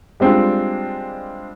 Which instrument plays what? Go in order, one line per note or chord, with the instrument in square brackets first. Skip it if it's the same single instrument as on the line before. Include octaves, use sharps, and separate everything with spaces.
[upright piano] G3 G#3 C4 D4 F4